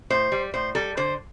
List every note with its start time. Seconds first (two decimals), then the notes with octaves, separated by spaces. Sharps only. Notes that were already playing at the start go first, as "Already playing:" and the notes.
0.10 A2 C5
0.32 G3
0.54 A2 C5
0.75 G3 A4
0.97 D3 C5